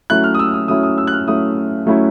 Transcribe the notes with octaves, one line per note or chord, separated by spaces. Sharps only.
F#3 A3 C#4 E4 F#6
F6
D#6
E6
D#6
F#3 A3 C#4 E4 D#6
D#6
E6
F#6
F6
F#3 A3 C#4 E4 D#6
F#3 A3 C#4 E4